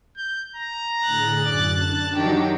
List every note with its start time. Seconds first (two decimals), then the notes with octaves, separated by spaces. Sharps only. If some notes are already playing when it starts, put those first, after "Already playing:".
0.17 G6
0.56 A#5
1.05 A2 D3 G#4 F#6 A6
1.45 F#2 D5
1.82 D4 A5
2.16 D#3 F#3 G4